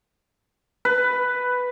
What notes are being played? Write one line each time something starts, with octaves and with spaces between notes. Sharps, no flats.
B4